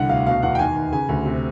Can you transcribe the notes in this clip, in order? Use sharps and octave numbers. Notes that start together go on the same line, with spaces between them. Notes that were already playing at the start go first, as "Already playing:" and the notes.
Already playing: C2 D3 F#5
D2 F5
B2 F5
E2 F#5
G5
D#3 G#5
D#2
C#3 G#5
D2
C3